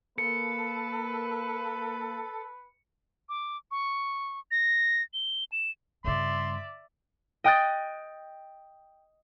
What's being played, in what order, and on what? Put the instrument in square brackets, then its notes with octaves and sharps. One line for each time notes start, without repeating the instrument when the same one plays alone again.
[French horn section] A#3 [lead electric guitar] A4 [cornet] B4 [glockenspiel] C#7
[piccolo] D6
C#6
A#6
G7
E7
[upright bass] G2 C#3 [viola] D5 E5 [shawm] C6
[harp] D#5 G5 D#6 F#6 A6